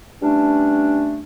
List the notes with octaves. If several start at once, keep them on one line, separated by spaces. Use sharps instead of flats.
E3 G3 A3 C#4 D4